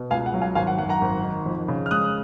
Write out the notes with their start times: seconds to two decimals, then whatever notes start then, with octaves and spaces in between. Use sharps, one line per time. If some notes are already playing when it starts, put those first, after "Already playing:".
Already playing: B2
0.11 C#2 F5 G#5
0.26 F#5
0.34 F#3
0.41 F5 G#5
0.55 G#1 F5 G#5
0.67 F#5
0.78 F#2 F#5
0.89 F#5 A#5
1.01 G#1
1.23 D#3
1.46 F2
1.68 C#3
1.86 F6
1.91 G#3 D#6 F#6